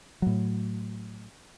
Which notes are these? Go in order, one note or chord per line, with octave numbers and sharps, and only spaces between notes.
A2 F#3